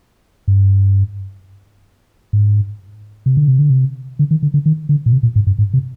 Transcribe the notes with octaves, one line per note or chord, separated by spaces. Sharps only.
G2
G#2
C3
D3
C3
D3
C3
D3
D#3
D3
D3
D#3
D3
A#2
C3
A#2
G#2
G2
G#2
C3